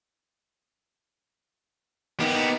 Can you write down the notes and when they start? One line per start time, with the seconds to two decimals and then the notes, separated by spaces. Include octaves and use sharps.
2.20 A#3 B3 D#4 G4